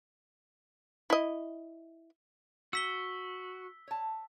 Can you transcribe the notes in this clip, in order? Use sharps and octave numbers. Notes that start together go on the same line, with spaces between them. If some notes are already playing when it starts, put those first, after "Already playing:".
E4 D#5
F#4 E6 B6 G7
C#5 A5